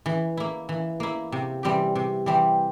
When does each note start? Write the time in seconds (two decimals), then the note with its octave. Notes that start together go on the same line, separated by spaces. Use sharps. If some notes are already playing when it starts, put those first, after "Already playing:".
0.06 E3
0.37 A#3 E4
0.69 E3
1.00 A#3 E4
1.32 C3
1.63 E3 G3 C4 G4
1.95 C3
2.26 E3 G3 C4 G4